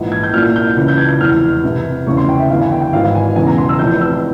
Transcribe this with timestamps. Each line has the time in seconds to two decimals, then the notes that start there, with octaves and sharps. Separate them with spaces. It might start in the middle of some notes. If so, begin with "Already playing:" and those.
Already playing: A#1 G#2 E3
0.12 G#6
0.23 G6
0.34 C2 A#2 F6
0.56 G6
0.76 C#2 C#3 E3 G6
0.88 G6
0.98 G#6
1.09 G6
1.21 F1 E2 E3 F6
1.63 C2 C3 E3
2.07 F1 E2 C#3 E3 C#6
2.17 C6
2.29 G5
2.39 E5
2.50 G1 G2 E3 F5
2.60 G#5
2.71 G5
2.82 G5
2.92 G#1 G#2 E3 F5
3.15 G#5
3.36 E1 E2 C#3 G#5
3.47 A#5
3.58 C6
3.69 E6
3.79 F1 F2 C3 E3 G6
4.01 E6